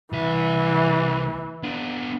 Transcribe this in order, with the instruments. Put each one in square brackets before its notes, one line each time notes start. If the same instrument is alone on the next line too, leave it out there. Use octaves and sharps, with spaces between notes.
[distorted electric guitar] C2 E5 [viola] E3
[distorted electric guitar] B3 D4